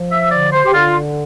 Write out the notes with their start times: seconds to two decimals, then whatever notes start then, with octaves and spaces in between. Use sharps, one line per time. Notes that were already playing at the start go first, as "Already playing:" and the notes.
Already playing: F3
0.11 E5
0.31 D3 D5
0.52 C5
0.64 G4
0.73 D3 F4